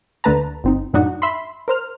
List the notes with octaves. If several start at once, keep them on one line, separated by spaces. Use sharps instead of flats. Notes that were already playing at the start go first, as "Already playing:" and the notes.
D2 D3 A3 B4 A5 A#5
G1 C4 D#4
F#2 A2 D4 D#4 F#4
E5 B5 C6
A#4 C5 F6